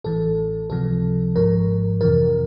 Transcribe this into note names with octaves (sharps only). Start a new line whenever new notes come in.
A1 A2 E3 A4
C#2 C3 F3 A4
G#1 G#2 F3 A#4
F2 C3 E3 A#4